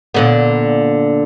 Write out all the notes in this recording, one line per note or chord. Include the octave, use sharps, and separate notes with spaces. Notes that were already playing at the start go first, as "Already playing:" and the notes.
A#2 D3 B3